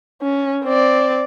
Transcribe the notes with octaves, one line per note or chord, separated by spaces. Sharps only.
C#4
C4 D5